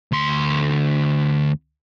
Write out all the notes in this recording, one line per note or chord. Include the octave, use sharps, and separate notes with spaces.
D2 C6